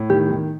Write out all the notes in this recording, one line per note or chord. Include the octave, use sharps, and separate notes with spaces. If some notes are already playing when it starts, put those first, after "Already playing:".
Already playing: A2
D#3 G4
D#3